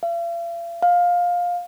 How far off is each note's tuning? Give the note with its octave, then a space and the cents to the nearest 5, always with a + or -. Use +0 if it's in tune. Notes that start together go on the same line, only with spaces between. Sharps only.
F5 -45
F5 +15